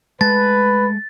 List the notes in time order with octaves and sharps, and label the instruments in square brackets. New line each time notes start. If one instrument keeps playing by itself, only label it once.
[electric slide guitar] G#3 A3 A5 [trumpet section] B4 [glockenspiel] A6